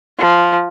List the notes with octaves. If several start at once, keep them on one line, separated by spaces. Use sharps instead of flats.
F3